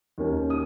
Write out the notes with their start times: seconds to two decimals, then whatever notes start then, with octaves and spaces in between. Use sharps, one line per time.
0.18 D#2 D#3 A#3 C#4
0.50 D#6